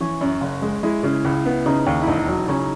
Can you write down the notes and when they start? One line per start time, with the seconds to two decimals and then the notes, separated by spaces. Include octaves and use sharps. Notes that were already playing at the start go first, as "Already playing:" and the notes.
0.01 E3 C#4
0.21 F#2
0.41 F#1
0.62 G#3
0.83 G#3 E4
1.03 C#3
1.25 C#2
1.46 B3
1.66 C#3 D#4
1.86 D#2
2.02 E4
2.07 E1 D#4
2.28 F#3
2.48 C#3 C#4